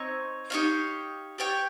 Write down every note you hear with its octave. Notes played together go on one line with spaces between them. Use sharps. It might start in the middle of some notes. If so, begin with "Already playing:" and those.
Already playing: C4 D#4 C#5
D#4 G4 C#5 F5
G4 C#5 G5